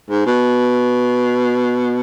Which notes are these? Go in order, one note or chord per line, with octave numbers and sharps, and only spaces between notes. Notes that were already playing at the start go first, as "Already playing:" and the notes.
G#2
B2